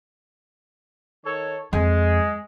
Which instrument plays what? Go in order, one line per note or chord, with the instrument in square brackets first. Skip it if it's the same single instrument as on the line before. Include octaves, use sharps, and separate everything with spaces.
[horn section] D#3 A4 C#5
[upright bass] F2 [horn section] G#3